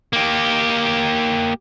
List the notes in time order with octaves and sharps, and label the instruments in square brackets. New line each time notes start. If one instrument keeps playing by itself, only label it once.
[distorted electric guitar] A#3 G4